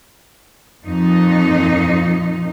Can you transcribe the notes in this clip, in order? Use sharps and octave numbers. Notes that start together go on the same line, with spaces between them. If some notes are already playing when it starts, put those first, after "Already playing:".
F2 A#2 D#4